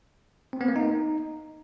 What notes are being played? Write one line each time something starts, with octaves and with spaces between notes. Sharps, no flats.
C4
B3
A#3
D#4